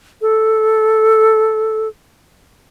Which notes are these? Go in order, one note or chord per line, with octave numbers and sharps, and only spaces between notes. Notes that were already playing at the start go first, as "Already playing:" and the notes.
A4